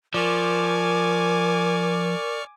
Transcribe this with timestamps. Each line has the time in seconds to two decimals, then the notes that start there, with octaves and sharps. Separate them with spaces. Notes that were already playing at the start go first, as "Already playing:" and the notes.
0.14 F3 A#4 D5 G#5 C#6 D6 F6